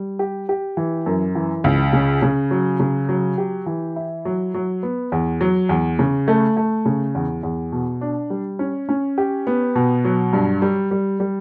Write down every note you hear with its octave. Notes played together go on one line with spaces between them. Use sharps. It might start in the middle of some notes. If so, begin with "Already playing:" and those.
Already playing: G3
G4
G4
E3
F#2
E3
C#2
C#3
C#3
F#3
C#3
F#3
G4
E3
E4
F#3
F#3
B3
E2
F#3
E2
C#3
A3
A3
C#3
E2
E2
B2
D4
G3
C#4
C#4
G4
B3
B2
F#3
G2
G3
G3
G3